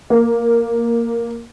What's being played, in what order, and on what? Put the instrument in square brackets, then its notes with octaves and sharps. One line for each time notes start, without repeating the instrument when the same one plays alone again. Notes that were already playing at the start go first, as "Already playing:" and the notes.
[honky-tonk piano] A#3